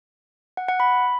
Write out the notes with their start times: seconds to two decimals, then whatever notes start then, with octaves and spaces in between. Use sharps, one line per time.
0.57 F#5
0.69 F#5
0.80 B5